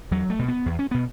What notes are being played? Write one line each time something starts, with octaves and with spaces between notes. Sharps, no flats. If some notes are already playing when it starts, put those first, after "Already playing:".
E2 F#3
A3
B2
B3
E2
C#4
B2 B3